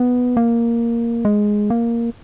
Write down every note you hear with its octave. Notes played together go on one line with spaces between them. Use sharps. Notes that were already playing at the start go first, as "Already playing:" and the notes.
Already playing: B3
A#3
G#3
A#3